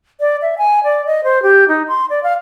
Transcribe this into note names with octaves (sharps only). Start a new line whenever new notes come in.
D5
E5
G#5
D5
D#5
C5
G4
D#4
C6
D5
F5